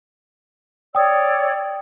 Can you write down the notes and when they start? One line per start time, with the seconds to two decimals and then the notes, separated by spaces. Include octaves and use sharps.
0.95 C#5 D5 G5 D#6 E6